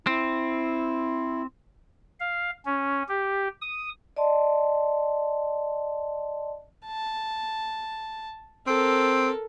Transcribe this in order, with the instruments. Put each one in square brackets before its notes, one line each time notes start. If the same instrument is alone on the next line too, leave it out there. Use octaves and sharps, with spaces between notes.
[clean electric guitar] C4 [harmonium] E4
[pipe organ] F5
C#4
G4
D#6
[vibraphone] D5 D#5 A5 C6
[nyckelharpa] A5
[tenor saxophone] C4 [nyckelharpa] A4 A#4